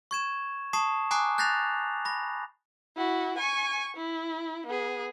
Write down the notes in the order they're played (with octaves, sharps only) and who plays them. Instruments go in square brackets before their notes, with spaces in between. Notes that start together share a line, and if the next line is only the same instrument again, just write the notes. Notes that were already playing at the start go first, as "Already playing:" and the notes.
[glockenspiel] C#6 G#6 E7
A5 C#6 D#6 C7 E7
G#5 A#5 D6 D#6 F#6 C7
F#6 G6 A6 A#6 C7 F7
B5 A#6
[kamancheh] E4 F#4
G#5 C#6
E4
B3 G#4